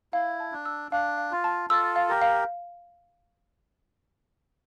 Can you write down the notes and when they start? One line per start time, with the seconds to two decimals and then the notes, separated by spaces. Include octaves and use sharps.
0.13 E4 F5
0.40 A5
0.52 D4
0.66 E6
0.92 D4 F5
1.18 F5
1.31 F4
1.44 A5
1.70 F4 A4 E6
1.96 F5
2.09 G4 A#4
2.22 F5